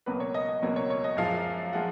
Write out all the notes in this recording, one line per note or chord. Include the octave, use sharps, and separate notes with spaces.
C#2 B2 F#3 A#3 B4
C#5
D#5
D#5
C#2 B2 F#3 A#3 C#5
C#5
C#5
D#5
F#2 F3 G#3 F5
F3 G#3 F#5